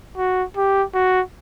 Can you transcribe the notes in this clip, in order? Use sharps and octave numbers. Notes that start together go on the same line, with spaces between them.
F#4
G4
F#4